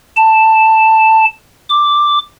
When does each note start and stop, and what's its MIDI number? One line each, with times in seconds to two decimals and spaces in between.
0.17 1.25 81
1.69 2.18 86